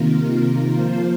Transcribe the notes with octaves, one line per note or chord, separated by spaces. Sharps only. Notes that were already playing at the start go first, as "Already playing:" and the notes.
Already playing: C3 D#3 A#3 F4 A#4
F3 A#3 F4 C5